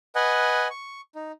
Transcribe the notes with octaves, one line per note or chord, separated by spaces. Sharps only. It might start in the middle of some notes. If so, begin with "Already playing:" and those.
B4 D#5 F#5 G#5
C#6
D#4